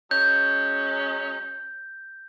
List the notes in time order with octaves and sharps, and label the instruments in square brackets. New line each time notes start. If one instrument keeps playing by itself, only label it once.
[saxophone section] F#3 G#3 C#4 [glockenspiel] G6